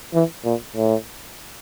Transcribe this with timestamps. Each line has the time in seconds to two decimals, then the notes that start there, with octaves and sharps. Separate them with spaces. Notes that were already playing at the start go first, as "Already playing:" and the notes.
0.14 E3
0.45 A#2
0.76 A2